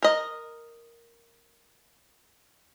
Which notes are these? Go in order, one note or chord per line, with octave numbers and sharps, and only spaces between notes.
A#4 D#5